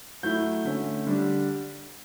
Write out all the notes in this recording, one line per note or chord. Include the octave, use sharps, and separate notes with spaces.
F#3 A3 E4 G6
D3 A3 C#4
D3 G3 D4